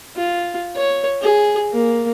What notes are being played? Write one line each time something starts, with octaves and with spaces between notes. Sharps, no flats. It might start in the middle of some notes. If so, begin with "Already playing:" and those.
F4
C#5
G#4
A#3